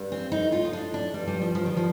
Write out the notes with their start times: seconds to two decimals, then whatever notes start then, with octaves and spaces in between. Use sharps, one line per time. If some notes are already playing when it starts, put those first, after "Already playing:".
Already playing: G2
0.12 C4
0.32 A2 D#4
0.52 F4
0.65 D#4
0.73 D4
0.94 D4
1.14 G2 G3
1.27 G3
1.41 F3
1.55 G2 F3
1.66 D#3
1.77 F3